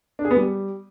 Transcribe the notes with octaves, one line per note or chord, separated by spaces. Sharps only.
D4
G#4
B3
G3